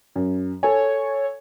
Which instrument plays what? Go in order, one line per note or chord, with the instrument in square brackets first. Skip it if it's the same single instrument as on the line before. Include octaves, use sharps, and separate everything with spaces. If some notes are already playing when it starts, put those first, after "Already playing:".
[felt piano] F#2
[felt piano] A4 G#5 [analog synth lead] C#5